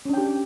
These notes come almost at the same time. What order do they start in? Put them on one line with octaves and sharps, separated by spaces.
C#4 D4 G5 G4